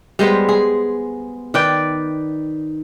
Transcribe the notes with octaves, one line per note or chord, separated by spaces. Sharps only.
G3 G#3 B3 C5
G#4
D#3 B4 D5 G5